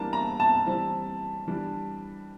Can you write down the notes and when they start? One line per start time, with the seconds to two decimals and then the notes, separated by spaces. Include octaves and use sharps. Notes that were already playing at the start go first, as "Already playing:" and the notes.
Already playing: E3 G3 A#3 D4 A5
0.13 A#5
0.40 A5
0.66 E3 G3 C4
1.48 E3 G3 D4